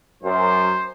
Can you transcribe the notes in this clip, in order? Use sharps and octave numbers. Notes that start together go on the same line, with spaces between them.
F#2 C5